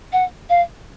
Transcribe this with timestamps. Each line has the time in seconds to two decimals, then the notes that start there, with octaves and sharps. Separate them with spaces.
0.12 F#5
0.49 F5